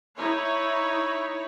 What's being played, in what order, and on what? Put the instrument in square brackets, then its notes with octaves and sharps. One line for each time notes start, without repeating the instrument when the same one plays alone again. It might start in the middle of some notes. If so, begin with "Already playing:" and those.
[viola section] D#4 E4 C#5